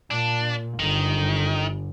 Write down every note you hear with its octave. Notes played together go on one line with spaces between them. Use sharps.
A#2 D4
G1 D#3